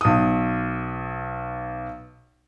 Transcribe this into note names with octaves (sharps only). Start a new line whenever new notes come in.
B1 D#6